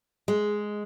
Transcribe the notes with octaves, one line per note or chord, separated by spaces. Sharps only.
G#3